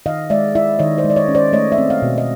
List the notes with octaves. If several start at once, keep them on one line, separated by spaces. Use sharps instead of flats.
D#3 D#5 F5
G#3 D5 E5
E4 D5 E5
D#3 C#5 D#5
C5 D5
G#3
D5
C#5 D#5
C#4
C5 D5
A3 C#5 D#5
D5 E5
C4
D#5 F5
B2
D#5